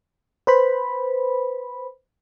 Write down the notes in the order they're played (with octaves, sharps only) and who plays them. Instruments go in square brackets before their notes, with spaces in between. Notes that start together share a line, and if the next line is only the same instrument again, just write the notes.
[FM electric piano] B4 C5 B5